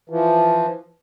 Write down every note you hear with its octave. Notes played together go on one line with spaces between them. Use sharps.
E3 F3